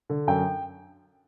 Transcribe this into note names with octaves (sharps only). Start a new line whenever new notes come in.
D3
F#2 G5